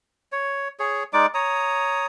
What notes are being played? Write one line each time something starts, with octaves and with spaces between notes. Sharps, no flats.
C#5
G#4 C#5
G#3 D#4 D5 D6
C#5 A#5 D#6